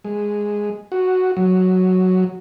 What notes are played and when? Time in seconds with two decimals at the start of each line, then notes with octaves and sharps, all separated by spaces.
0.04 G#3
0.92 F#4
1.37 F#3